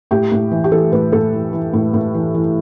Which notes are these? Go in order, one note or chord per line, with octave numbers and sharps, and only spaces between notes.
A2 G4
A2
E3
G4
E3 A4
A2 B4
A2 A4
E3
E3
A2
A2
E3
E3